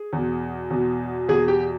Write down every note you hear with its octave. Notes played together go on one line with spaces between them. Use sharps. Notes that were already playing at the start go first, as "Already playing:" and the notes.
Already playing: G#4
E2 B2
E2 B2
E2 B2 G#4
G4